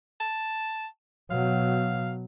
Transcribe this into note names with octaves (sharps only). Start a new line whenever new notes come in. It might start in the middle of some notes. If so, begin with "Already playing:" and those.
A5
B2 F#3 F5